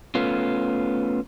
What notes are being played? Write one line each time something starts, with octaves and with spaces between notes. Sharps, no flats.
A3 B3 C#4 F4